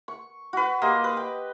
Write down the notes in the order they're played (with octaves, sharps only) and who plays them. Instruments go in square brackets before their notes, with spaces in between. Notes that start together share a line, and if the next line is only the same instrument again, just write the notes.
[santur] C#6
F#4 B4
A#3 G4 D#5 C6
B4
G5